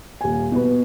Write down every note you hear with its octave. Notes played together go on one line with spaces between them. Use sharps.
D#1 G#5
B2 B4